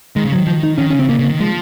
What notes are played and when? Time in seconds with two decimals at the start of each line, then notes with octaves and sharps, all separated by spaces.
0.16 D#3 G#3
0.25 C#3
0.32 D#3 F#3
0.47 F3
0.63 D#4
0.78 D#3 C#4
0.90 C#3 C#4
0.99 C4
1.09 C#3 A#3
1.19 C#3
1.29 D#3
1.40 F3 G#3